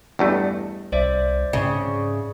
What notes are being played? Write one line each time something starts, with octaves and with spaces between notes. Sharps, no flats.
E2 G2 A3 D#5
C2 C5 D5 E5
G#2 C#3